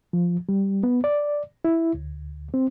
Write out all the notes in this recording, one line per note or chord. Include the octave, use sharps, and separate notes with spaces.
F3
G3
B3
D5
E4
D2
C4